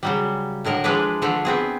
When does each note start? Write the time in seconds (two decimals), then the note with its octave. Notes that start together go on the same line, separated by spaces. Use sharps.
0.03 C#3 F#3 G3
0.64 A2 D3 A#4 D#5
0.84 E3 F3 G#3 D4 B4
1.22 D3 F3 A3
1.45 B3 C4 G#4